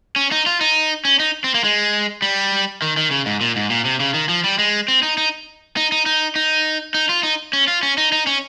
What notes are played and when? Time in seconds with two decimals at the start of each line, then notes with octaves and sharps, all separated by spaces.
0.16 C#4
0.32 D#4
0.46 F4
0.61 D#4
1.05 C#4
1.20 D#4
1.44 C4
1.54 A#3
1.64 G#3
2.22 G3
2.82 D#3
2.97 D#3
3.11 C#3
3.26 G#2
3.41 A#2
3.56 G#2
3.70 A#2
3.85 C3
4.00 C#3
4.14 D#3
4.29 F3
4.44 G3
4.59 G#3
4.88 C4
5.03 D#4
5.17 D#4
5.77 D#4
5.92 D#4
6.06 D#4
6.36 D#4
6.94 D#4
7.09 F4
7.23 D#4
7.53 C#4
7.68 F4
7.83 C#4
7.98 D#4
8.12 D#4
8.27 C#4